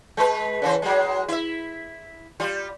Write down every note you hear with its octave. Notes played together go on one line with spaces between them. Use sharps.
G#3 B4
C#3 E3 C5
F#3 G#3
E4 E5
G3 F4